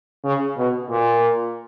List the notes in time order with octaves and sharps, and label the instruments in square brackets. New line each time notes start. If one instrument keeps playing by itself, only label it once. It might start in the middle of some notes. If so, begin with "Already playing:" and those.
[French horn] C#3
B2
A#2